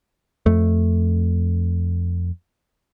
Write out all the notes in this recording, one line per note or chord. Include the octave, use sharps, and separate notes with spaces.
F2 A3